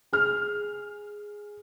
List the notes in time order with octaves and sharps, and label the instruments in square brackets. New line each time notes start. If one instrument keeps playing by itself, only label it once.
[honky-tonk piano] G#4 F6